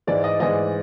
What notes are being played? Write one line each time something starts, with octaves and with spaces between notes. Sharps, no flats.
G#2 E3 G#3 D5
D#5
G#2 E3 G#3 D#5